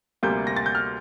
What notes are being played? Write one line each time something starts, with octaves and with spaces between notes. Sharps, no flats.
D2 C3 G3 A#3 G6
A#6
A6
G6
F6